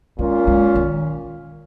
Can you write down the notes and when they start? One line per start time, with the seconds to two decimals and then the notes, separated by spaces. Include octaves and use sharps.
0.19 A#2 G#3 A#3 C#4 F4
0.47 G#3
0.75 D#3